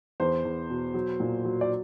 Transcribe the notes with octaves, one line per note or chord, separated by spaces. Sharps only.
E2 C5
E2
B2
F#3
A#2
F#3
D5